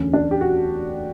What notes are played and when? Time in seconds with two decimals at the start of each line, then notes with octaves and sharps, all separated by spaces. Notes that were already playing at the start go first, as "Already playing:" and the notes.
Already playing: E1 D2 D3 C#4
0.13 D4
0.31 G4
0.41 F#4